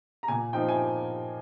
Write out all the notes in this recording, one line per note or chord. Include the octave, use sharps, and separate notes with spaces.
A#5
A#2 G#5
F3 C4 D#4 G5
G#5